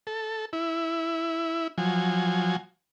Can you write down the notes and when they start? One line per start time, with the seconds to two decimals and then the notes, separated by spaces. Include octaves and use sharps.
0.07 A4
0.53 E4
1.78 F3 F#3 G#5